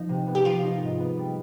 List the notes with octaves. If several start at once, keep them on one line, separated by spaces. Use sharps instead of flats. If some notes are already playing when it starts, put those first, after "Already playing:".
Already playing: F3 D#4
C3
B3
G4
F3 F4
D#4
G#2
B3
G3